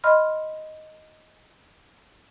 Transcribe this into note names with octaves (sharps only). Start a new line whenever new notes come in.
D#5 B5 C6 F6